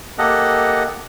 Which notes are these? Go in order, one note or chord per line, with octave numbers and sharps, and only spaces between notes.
A#3 G4 A4 D#5 F#5